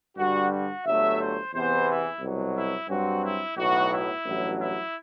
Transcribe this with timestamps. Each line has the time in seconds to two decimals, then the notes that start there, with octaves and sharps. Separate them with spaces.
0.16 G2 D3 G3 F#4
0.51 F#4
0.85 G1 G2 F#3 A3 E5
1.19 C5
1.53 E2 C3 E3 B3 C5
1.87 E4
2.20 C2 B2 F#3
2.55 E4
2.89 G2 F#3 C4 F#4
3.23 E4
3.57 B1 A2 F#3 B3 F#4
3.91 E4
4.25 A1 G2 F#3
4.59 E4